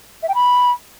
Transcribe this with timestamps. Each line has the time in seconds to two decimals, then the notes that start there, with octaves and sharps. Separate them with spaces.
0.22 E5
0.28 G5
0.34 B5